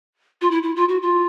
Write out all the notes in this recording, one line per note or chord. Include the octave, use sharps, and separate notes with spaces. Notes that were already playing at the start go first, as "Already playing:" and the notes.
F4
E4
E4
F4
F#4
F4